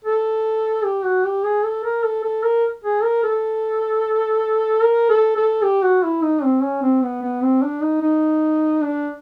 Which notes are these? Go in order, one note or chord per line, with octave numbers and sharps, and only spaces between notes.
A4
G4
F#4
G4
G#4
A4
A#4
A4
A4
A#4
G#4
A#4
A4
A#4
A4
A4
G4
F#4
E4
D#4
C4
C#4
C4
B3
B3
C4
D4
D#4
D#4
D4